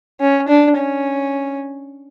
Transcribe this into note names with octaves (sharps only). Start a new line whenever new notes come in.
C#4
D4
C#4